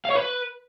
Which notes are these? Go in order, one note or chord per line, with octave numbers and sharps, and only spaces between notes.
F5
C#5
B4